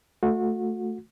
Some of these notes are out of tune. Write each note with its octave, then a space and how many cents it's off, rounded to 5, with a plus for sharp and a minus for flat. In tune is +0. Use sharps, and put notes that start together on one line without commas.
A3 +0 F#4 -30